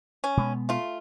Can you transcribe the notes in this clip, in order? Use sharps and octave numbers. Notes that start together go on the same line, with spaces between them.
C#4
B2 G#3 B3
A3 F4